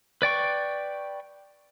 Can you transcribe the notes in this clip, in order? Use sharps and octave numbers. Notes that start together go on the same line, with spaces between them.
B4 D5 G5 C#6